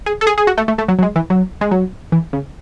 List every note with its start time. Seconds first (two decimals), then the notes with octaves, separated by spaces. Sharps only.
0.06 G#4
0.21 A4
0.27 G#4
0.38 G#4
0.47 F#4
0.58 A3
0.68 A3
0.78 A3
0.88 F#3
0.99 F#3
1.03 G#3
1.16 E3
1.30 F#3
1.61 G#3
1.71 F#3
2.12 E3
2.33 C#3